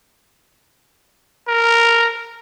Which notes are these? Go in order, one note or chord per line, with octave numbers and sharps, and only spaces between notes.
A#4